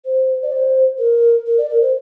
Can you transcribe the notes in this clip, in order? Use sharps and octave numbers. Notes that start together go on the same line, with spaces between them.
C5
D5
C5
A#4
A#4
D5
A#4
C5